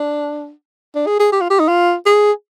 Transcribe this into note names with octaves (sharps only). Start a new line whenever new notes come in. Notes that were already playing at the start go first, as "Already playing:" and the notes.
Already playing: D4
D4
G#4
G#4
G4
F4
G4
D#4
F4
G#4